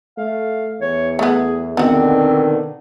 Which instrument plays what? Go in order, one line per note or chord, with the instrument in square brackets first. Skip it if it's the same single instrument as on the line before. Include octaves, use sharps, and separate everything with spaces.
[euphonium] A3 [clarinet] F5
[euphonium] E2 [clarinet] C#5
[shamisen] A3 B3 [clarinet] G#4
[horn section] B2 D3 D#3 [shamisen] B3 F#4 [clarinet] C4